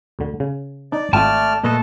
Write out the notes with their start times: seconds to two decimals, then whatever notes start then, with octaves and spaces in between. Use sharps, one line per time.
0.19 D2 D3
0.40 C#3
0.92 D4 D#4 D5
1.13 G#1 A3 F4 D5 E5 G5 A5 F6
1.63 A#2 A3 A4 B4 D#5